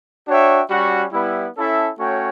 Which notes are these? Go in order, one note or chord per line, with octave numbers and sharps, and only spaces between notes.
D4 F#4 C#5 E5 G5
G3 C#4 F#4
G3 B3 E4
C#4 E4 A4 E5
A3 C#4 F#4 C#5 G5